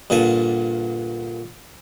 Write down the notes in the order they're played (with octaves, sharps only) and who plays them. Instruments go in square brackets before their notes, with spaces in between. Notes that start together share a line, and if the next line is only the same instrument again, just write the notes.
[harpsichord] G2 A#2 D3 F#5 G#5 A5